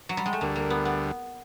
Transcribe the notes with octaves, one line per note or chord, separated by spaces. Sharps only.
F#3
G3
G#3
A3
D2 D3 G3 A#3
A#3
B3
B3